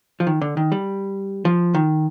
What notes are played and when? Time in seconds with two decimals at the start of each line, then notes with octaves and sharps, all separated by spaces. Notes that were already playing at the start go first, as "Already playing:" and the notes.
0.20 F3
0.27 D#3
0.41 D3
0.57 D#3
0.72 G3
1.45 F3
1.74 D#3